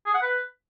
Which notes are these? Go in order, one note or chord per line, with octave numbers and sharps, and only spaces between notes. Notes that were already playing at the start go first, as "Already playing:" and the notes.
G#4
F#5
B4